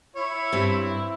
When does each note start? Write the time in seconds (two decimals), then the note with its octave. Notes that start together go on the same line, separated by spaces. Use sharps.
0.16 E4 C#5
0.53 G2 G3 C4